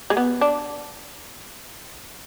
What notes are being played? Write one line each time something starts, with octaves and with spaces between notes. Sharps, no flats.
G#3
B3
D4